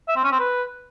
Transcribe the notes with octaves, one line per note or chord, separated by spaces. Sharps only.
E5
C4
C#4
C4
B4